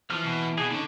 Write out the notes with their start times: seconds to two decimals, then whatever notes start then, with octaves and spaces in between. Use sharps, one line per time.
0.10 E3 F3 F6
0.24 B2
0.58 B2 G#4
0.71 D3 C#4 D#4